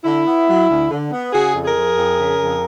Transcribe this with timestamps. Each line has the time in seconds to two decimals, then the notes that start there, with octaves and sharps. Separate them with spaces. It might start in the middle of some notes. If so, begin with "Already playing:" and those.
0.05 D3 E4
0.26 B3
0.48 F#3
0.69 D2
0.90 D3
1.11 B3
1.33 C#3 F#4 G#4
1.54 F2
1.65 G#4 A#4
1.75 F3
1.96 F2
2.19 C#3
2.40 F2